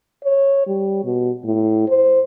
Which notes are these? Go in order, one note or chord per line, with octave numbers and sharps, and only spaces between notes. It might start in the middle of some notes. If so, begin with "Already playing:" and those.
C#5
G3
B2
A2
C5